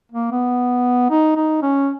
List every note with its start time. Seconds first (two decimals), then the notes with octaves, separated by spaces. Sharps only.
0.12 A#3
0.32 B3
1.10 D#4
1.36 D#4
1.62 C#4